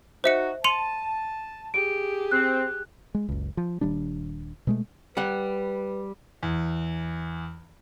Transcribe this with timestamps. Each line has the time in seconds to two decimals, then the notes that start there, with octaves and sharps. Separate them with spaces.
0.24 D#4 F#4 C5 E5 C#7
0.64 A5 C6 C#7 D#7 F7
1.74 G4 G#4 D7
2.31 C4 F#6
3.15 G#3
3.29 F#1 C#2
3.57 F3
3.81 D#1 D#2 G3 D4
4.67 B2 G#3 A3
5.17 G3 B4 F#5
6.43 E2